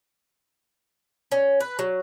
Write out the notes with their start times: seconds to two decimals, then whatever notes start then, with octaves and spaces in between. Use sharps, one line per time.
1.32 C#4
1.60 B4
1.79 F#3